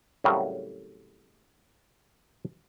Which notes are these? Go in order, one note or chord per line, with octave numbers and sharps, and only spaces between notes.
A2 C#3 F#3 G3 C4 A#4